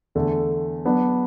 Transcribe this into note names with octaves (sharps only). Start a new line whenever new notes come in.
E2 D3 A3
F#3 B3 D4